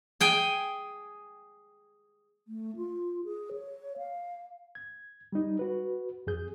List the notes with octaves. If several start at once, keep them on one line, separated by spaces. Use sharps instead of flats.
G#4 G5 G#5
A3
F4
G#4
C#5
F5
G#6
G3 D#4
F#4 B4
F2 G#4 G6